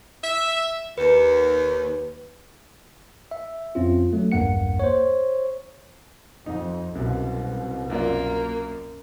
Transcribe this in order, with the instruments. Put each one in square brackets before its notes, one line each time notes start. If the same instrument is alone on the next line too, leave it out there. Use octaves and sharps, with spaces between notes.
[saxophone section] E5
[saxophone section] D#2 [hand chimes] B4
[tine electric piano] E5
F2 C4 C#4 F4
F#3 A3
A#1 E2 G2 A#3 F#5 C#7
C5 C#5
[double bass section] F2 [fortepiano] D#4
[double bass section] C2 B2 [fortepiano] F#2
[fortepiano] F#2 F4 D5 [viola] A#3